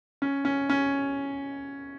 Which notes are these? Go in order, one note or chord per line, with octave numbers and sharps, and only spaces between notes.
C#4
C#4
C#4